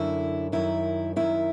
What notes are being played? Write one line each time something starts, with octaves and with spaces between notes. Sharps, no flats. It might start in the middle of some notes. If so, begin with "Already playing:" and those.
Already playing: F#2 D3 E4
F#2 D#3 E4
F#2 D#3 E4